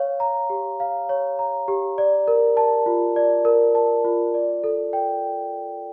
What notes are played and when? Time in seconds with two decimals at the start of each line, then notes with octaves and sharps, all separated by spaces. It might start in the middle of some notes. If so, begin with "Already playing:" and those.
Already playing: C#5 F5
0.20 A#5
0.50 G4
0.80 F5
1.09 C#5
1.39 A#5
1.68 G4
1.98 D5
2.27 A#4
2.57 A5
2.86 F4
3.16 D5
3.45 A#4
3.75 A5
4.05 F4
4.34 D5
4.63 A4
4.93 G5